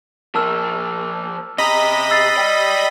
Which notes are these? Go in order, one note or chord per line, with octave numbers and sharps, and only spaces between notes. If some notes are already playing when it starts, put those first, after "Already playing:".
F3 A#4 A5 E6 F6
C3 D#5 A#5 B5
E6 A6 C7
D5 G5